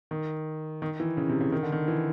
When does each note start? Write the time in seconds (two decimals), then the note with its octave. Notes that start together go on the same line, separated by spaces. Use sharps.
0.11 D#3
0.82 D#3
1.00 E3
1.17 C#3
1.29 C3
1.41 C#3
1.52 D#3
1.63 D3
1.72 D#3
1.88 E3